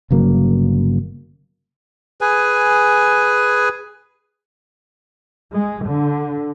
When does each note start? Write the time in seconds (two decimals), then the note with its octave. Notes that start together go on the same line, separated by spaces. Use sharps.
0.11 G1 C#3 F#3 A#3
2.21 G#4 B4 G#5
5.53 G#3
5.86 D3